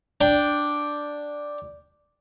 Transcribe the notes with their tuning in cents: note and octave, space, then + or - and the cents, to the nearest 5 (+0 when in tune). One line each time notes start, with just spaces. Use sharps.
D4 +0 G5 +0